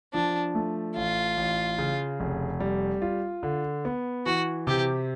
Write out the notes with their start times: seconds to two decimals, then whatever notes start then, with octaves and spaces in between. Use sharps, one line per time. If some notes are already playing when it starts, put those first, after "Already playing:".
0.14 F3 D4
0.55 A3
0.96 A1 F4
1.38 A1
1.78 C#3
2.20 F1
2.60 G3
3.02 F4
3.43 D3
3.85 B3
4.26 E3 F#4
4.67 C3 G4